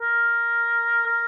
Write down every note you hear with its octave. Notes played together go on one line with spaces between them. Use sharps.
A#4
A#4